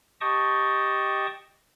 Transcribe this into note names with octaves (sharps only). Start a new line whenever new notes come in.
G4 D#5 G5 A5 C#6 D#6